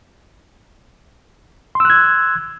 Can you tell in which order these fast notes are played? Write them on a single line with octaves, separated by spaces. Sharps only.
C6 E6 F#6 G#6